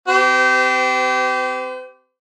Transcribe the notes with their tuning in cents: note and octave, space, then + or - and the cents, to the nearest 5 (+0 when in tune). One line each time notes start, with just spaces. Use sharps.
C4 -30 G4 -25 C5 -45